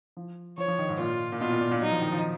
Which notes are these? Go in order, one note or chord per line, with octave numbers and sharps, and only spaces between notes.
F3
F3 C#5
F3
D#3
G#2
A#2 F4
A#2
B2 F4
A#2
A#2
A#2
F#3 D#4
F3
D#3
F3